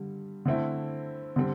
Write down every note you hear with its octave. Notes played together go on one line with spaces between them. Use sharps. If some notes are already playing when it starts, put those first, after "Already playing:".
Already playing: G2 D3 G3
D3 A3 C4 E4
D3 G3 C4